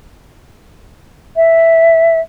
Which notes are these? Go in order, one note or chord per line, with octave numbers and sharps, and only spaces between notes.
E5